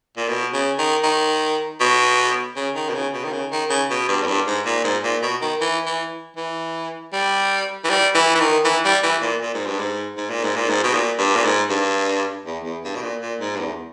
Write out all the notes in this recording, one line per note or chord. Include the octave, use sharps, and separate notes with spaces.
A#2
B2
C#3
D#3
D#3
B2
C#3
D#3
B2
C#3
B2
D#3
C#3
D#3
C#3
B2
G2
E2
G2
G#2
A#2
G#2
A#2
B2
D#3
E3
E3
E3
G3
E3
G3
E3
E3
D#3
E3
G3
E3
A#2
A#2
G#2
G2
G#2
G#2
A#2
G#2
A#2
G#2
B2
A#2
G2
A#2
G#2
G2
E2
E2
G2
B2
A#2
A#2
G#2
G2
E2